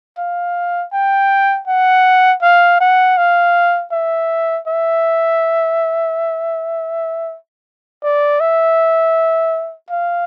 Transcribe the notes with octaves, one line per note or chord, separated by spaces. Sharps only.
F5
G5
F#5
F5
F#5
F5
E5
E5
D5
E5
F5